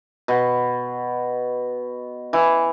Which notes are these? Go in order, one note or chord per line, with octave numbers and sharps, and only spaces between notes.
B2
E3